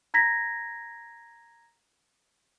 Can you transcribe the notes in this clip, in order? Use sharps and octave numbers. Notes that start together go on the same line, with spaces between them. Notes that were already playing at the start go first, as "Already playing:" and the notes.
A#5 G#6 A#6 B6